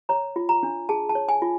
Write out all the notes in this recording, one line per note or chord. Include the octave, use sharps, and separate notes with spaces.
C#5 A#5
F4
A#5
D4
G#4 A5
A5
C#5
G#5
F4